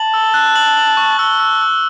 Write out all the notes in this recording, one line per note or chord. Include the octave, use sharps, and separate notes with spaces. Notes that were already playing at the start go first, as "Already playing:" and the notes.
Already playing: A5 F#7
E6
F#6
F#7
F#7
C#6
A5 E6
E6
E6